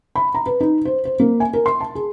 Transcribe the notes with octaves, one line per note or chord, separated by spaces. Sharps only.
B5
A#5
B4
D#4
C5
C5
A#3
G#5
A#4
C6
A5
G#4